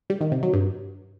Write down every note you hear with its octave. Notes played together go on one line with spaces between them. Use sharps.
G3
D#3
C3
F#3
G2